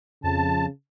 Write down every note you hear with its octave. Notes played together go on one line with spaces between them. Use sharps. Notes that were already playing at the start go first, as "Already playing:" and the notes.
F2 C#3 A5